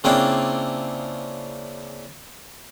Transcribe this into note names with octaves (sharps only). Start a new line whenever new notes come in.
C#3 A#3 C4 D4 E4 F4